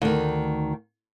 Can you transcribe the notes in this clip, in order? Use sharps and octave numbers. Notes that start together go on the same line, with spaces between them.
D2 D#3